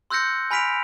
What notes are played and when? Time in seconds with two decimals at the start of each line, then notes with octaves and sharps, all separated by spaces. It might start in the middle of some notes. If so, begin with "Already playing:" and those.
0.10 C6 E6 F#6 G6 A#6 C#7
0.51 G#5 B5 F6 B6 D7 F7